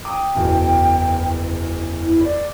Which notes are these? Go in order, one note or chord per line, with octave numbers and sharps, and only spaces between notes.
G5 D6 D#6
F#1 E2 B2
E4
D5